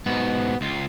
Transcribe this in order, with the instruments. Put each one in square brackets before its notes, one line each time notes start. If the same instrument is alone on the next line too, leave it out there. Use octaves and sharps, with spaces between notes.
[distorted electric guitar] G#2 B2 [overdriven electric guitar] B3
[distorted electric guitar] C#2 F4